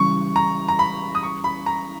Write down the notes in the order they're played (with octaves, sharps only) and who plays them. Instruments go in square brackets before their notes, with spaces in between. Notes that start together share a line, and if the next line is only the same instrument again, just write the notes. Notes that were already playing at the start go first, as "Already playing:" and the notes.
Already playing: [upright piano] C#3 E3 G3 [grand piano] C#6
[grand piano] A#5
A#5
B5
D#6
C#6
B5
A#5